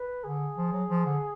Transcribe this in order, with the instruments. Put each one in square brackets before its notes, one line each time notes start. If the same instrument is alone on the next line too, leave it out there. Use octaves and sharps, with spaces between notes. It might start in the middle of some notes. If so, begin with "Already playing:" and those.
Already playing: [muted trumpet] B4
[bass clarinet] D3 [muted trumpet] G#4
[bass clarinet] F3
F#3
F3
D3